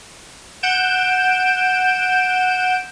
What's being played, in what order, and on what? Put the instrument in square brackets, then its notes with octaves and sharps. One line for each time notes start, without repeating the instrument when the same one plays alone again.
[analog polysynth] F#5 G6 D7 E7